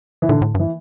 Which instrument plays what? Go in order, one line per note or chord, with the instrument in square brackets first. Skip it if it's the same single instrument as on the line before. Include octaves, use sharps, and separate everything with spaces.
[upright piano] E3
[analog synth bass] A#2 [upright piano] D3
[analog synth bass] A2
[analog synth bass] G2 [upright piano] E3